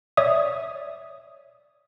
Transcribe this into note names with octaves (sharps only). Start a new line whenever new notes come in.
C#5 D5 E5 D#6